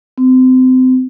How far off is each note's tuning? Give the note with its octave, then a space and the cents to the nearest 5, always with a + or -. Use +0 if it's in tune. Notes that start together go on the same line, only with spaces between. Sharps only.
C4 -30